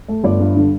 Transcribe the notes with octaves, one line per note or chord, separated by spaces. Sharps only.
A3
G1 D5
G2
D3